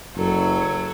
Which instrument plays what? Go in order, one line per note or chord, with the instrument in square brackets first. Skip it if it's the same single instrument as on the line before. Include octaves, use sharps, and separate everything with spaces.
[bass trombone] F#1 [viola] F#3 A4